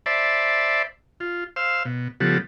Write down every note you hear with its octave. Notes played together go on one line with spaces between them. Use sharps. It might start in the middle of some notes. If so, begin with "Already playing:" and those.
C5 D5 E5 A5 B5
F4
C5 F5 E6
B2
C#3 F3 G3 B3 F#4 A4